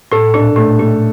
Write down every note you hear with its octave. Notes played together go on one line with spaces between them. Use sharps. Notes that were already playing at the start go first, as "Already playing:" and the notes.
A2 A4
A#2 D4
A2 A3
A#2 A3